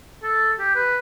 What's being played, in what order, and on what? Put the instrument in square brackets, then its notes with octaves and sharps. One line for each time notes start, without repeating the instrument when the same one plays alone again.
[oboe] A4
G4
B4